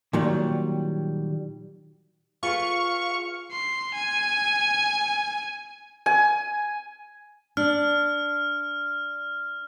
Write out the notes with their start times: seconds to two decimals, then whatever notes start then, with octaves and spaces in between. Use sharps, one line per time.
0.13 A#2 D#3 F#3 G3
2.43 F4 G#4 B4 F5 C#6
3.52 C6
3.94 G#5
6.06 G#5
7.57 D4 F6